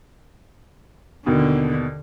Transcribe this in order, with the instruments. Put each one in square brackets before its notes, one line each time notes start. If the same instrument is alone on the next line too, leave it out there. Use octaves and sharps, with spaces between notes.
[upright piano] D#2 B2 [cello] D3